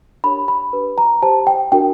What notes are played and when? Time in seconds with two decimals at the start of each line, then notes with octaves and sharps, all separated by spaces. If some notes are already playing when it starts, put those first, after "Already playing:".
0.24 D4 G4 A#4 C#5 B5
0.48 B5
0.73 D4 G4 B4
0.98 A#5
1.22 G4 C5 A5
1.47 G5
1.72 D4 F#4 A#4 G5